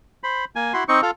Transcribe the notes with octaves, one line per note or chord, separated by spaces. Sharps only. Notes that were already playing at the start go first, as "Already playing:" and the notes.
C5 B5
A#3 G#5
E4 F#4 C6
C4 D#4 C#6
F4 A4